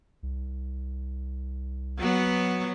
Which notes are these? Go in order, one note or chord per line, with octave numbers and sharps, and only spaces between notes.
C2
F#3 B3